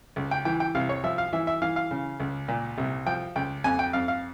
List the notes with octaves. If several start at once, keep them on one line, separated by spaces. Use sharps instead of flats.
C#2
G5
E3 G5
G5
C2 F5
C#5
F3 E5
F5
E3 E5
E5
E3 F5
F5
C#3
C#2
A#2
C2
F3 G5
C#2 G5
F2 G#5
G5
F2 F5
F5